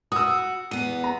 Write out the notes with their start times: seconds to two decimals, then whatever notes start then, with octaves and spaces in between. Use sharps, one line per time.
0.12 F#4 D#6 E6
0.71 E2 B3 D#7
1.04 A#5